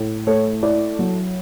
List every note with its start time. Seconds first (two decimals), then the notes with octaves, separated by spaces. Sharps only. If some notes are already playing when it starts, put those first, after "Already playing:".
Already playing: A2
0.27 A3 C#5
0.63 E4 D5
0.99 F#3